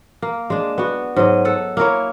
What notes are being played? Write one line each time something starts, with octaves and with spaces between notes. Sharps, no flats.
A#3
G#3 D4
B3 F#4
G#2 F#3 D#5
A4 F#5
A#3 E4 A#4 C#5